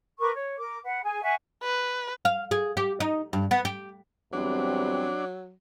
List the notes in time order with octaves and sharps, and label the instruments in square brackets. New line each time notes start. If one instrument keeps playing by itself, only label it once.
[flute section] A#4 B4 C#6 D6
C#5
A#4 D6
B4 F#5
G#4 G#5
E5 F#5 G#5 C#6
[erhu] B4
[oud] F5
G#4
G4
D#4
G2
B3
G4
[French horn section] E2 G3 C4 [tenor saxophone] F#3 [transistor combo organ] D4